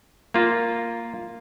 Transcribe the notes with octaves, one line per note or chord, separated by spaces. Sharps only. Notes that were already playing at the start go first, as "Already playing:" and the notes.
A#3 F4